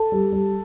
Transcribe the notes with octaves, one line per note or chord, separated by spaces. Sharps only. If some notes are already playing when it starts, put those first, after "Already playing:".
Already playing: A4 A5
G3
G3